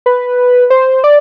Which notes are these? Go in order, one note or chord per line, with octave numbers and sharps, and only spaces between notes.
B4
C5
D5